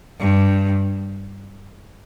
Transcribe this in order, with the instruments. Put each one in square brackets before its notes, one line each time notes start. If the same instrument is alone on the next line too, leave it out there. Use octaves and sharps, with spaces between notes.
[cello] G2